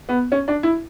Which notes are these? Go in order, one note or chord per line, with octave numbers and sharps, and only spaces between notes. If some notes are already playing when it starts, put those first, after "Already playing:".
B3
C#4
D4
E4